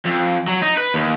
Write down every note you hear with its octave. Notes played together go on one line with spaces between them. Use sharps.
F2
F#3
D#4
B4
D#2